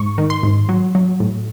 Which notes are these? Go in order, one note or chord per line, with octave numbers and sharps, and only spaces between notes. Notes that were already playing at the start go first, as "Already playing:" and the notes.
Already playing: G#2 C#6
D#3
C6
G#2
F#3
F#3
A2